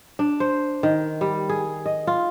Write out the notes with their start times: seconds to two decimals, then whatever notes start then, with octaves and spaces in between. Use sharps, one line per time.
0.19 D4
0.40 C5
0.83 D#3
1.21 G3
1.49 G#4
1.86 D#5
2.07 F4